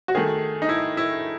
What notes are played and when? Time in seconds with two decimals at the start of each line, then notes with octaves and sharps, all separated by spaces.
0.08 F#4
0.15 D#3 A3 G#4
0.62 D#4
0.69 E4
0.97 E4